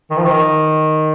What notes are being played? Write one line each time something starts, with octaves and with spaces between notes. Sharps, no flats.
D#3
F3
D#3